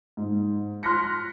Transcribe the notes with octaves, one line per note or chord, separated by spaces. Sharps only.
G#2
C6 F6 F#6 A#6 B6 C#7